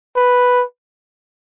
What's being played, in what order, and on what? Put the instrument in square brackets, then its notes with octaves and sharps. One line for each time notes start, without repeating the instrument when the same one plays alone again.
[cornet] B4